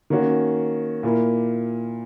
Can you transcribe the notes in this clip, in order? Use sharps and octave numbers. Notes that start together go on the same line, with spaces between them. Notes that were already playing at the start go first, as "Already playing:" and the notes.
D#3 A#3 C#4 F#4
A#2 A#3 E4 A#4